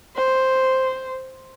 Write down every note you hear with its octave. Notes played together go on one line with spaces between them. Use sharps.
C5